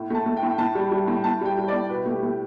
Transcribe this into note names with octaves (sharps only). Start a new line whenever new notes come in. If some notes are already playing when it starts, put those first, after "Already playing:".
Already playing: A2
A3 A5
A3
G5
A2
A2 A5
G3
G3
A2
A2 A5
G3 G5
G3
D5
A2
B2 B4
A3
G4
A3